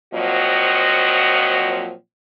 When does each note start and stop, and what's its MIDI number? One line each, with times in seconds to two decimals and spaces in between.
0.14 1.93 46
0.14 1.93 53
0.14 1.93 54
0.14 1.93 60
0.14 1.93 66
0.14 1.93 75